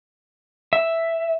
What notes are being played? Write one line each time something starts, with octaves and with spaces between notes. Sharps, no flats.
E5